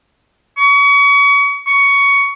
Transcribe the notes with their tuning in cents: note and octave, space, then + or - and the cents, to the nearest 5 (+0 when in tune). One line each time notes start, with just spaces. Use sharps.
C#6 +35
C#6 +15